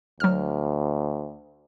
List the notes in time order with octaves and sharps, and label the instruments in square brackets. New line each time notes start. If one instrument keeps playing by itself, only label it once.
[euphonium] D2 [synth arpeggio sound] F#3 F6